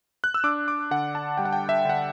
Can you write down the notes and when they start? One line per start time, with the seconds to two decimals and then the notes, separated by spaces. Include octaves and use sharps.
0.24 F#6
0.34 E6
0.44 D4 D6
0.68 D6
0.91 D3 F#5
1.15 A5
1.38 G3 G5
1.45 F#5
1.53 G5
1.69 E5
1.85 D3 F#5